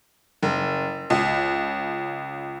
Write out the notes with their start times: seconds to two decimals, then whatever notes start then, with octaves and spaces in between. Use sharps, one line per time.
0.43 F#1
1.10 C#2